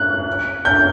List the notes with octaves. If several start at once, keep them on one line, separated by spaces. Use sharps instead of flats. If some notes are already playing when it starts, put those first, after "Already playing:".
Already playing: F#6
G6